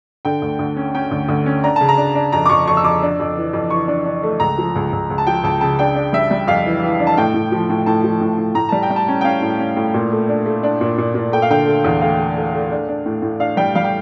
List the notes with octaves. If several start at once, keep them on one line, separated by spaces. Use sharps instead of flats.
D3 G5
D2
D2
C#4
C#4 G5
D2
D2
C#4
D4 A#5
C#3 A5
A#5
D4
D4
F2 A#5
D6
F2 C#6
F2 C#6
E6
F2 D6
D4
F2
E3
F2
E3 C#6
D4
D4
A3
C#2 A#5
F3
C#2
C#2
C#2
A5
F3 G5
C#2 A5
C#3 A5
D4 G5
D4
G3 E5
G3
F2 F5
E3
E3
D4
A5
A2 G5
A2
F3
A2
A2 A5
F3
A2
A2
A2 A#5
G3 A5
G5
G3
A5
C#4
G5
C#4 F5
A2
C#4
A2
A#2
A3
D4
A3
D4
A#2
A#2
A#2
A3 G5
F5
D3 G5
A3
E2
A3 F5
A3
A3
A3
D4
D4
A2
A2
D4 F5
G3 G5
G3 F5
G5